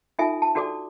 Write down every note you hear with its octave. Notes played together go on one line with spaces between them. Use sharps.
D#4 F4 A4 E5 G#5
A5
D4 F#4 A4 D5 D6